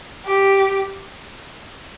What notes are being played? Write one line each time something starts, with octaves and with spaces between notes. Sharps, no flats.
G4